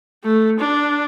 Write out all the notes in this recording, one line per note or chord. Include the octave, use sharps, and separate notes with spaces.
A3
D4